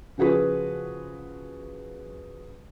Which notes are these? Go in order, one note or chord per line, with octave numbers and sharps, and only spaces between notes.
C#3 F3 F#4 G#4 B4